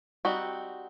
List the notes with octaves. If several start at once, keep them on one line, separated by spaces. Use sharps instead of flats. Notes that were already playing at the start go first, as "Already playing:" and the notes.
G3 C4 D#4 F#4